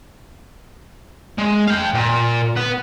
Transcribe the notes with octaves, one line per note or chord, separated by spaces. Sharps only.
G#3
F5 G5
A#2
B3 B4